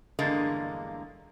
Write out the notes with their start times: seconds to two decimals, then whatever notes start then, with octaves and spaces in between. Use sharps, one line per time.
0.19 E2 G2 D3 G#3 A#3